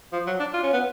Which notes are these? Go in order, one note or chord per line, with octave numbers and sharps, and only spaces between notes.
F3
F#3
D4
F4
C#4
B3